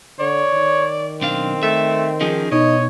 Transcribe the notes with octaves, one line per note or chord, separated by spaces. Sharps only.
D3 C#5 D5
D#3
B1 C4 D4 F5
A3 E5
F3 C#4 D#4 G#4
B2 D#4 C#5 D#5